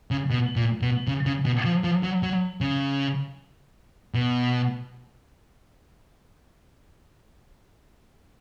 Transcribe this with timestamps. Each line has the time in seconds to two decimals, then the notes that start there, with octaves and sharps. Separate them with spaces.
0.11 C#3
0.30 B2
0.56 A#2
0.82 B2
1.07 C#3
1.26 C#3
1.45 B2
1.65 F3
1.84 F3
2.03 F#3
2.23 F#3
2.61 C#3
4.14 B2